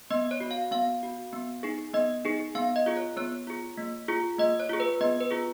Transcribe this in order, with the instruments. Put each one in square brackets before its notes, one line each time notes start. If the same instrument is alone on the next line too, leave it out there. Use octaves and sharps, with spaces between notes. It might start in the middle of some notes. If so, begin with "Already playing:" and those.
[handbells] B3 D#5
C#5
F#4
F5
B3 F5
F#4
B3
D#4 G#4
B3 D#5
D#4 G#4
B3 F5
D#5
F4 G#4
C#5
B3 C#5
F4 G#4
A#3
F4 G#4
A#3 D#5
C#5
F4 G#4
B4
B3 D#5
B4
F4 G#4